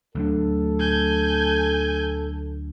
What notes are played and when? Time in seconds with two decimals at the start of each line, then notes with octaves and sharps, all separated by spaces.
0.15 D2 F#3 D4 A4
0.80 G#5 G6